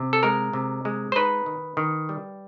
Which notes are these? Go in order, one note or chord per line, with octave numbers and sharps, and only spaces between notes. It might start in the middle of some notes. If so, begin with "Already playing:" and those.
Already playing: C3
A4
G#3 A#4
C3
G#3
C5
D#4 B4
D#3
D#3
G3